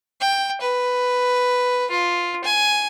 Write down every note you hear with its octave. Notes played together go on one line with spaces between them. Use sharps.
G5
B4
F4
G#5